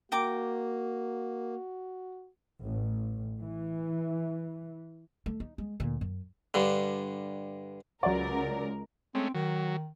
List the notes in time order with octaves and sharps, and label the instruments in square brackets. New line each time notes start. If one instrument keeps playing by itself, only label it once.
[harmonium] A#3 [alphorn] F#4 [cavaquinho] G5 A#5 D6
[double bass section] A1
E3
[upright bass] A3
D#4
G#3
D2 A#2
F#2
[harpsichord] G2 D3
[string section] C#2 A#4 [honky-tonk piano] F#3 D5
[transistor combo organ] G#3 A3 C#4 [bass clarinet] C4
[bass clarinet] D#3 [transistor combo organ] F#3